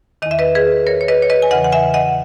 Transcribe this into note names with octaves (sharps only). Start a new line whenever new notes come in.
E2 D#3 D#5
E5
B4 D#5
G#4 B4
A#4 C#5
C#5
B4 D#5
C#5
B4 D#5
G#5
E2 C#3 E3 D#5 F#5
F#5
E5 G#5
D#5 F#5